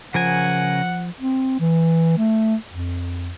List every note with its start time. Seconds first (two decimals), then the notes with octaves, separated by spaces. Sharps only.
0.14 C#3 F3 A#4 F#5 G#5
1.21 C4
1.60 E3
2.18 A3
2.70 F2